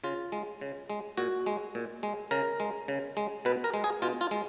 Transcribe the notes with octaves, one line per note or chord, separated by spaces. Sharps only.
C#3 F4
G#3
C#3
G#3
A#2 F#4
G#3
A#2
G#3
C#3 A#4
G#3
C#3
G#3
B2 B4
A#4
G#3
G#4
B2 F4
F4
G#3